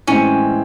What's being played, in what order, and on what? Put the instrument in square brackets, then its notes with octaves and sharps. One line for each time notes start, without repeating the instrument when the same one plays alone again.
[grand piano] A2 E3 G#3 C4 [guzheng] C#4